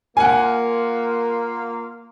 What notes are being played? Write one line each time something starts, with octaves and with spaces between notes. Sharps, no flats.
A#3 F4 F#5 G#5